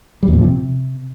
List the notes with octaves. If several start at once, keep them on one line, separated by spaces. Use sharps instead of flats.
G3
E2
A#2
F3
C3